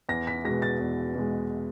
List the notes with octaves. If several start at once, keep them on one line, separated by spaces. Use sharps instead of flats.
E2 A#6
B6
B2 G#3 A#6
A6
E2
B2 G#3